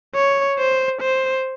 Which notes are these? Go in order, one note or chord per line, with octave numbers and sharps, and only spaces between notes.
C#5
C5
C5